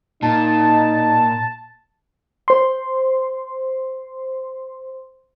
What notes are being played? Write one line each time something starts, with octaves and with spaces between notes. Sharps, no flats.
A#2 D#4 A5
C5 C6